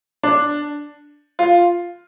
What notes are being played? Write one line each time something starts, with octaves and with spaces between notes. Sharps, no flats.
D4
F4